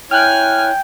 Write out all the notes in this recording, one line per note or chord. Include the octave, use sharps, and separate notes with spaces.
E4 C#5 G5 G#5 F6 F#6